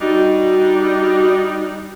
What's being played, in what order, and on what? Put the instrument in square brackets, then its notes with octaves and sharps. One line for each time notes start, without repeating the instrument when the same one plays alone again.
[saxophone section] G3 D4 D#4 [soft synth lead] F#4